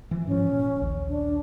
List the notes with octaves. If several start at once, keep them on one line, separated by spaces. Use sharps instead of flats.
E3 F3
G#2 F3 C#4
A#2
A#1 D#2
D4